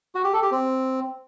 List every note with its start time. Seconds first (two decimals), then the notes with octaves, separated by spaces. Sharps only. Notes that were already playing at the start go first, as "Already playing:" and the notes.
0.15 F#4
0.24 G4
0.33 A4
0.42 G4
0.51 C4